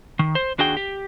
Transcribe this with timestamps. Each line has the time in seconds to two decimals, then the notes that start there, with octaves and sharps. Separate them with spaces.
0.19 D#3
0.35 C5
0.58 D#2 D4 F#4 G#4 G5
0.77 G4